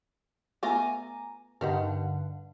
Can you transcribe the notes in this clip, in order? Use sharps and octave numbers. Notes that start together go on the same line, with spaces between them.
A3 B3 F4 G#5 A#5 D6
G2 D3 D#4 G4 A#4 F#5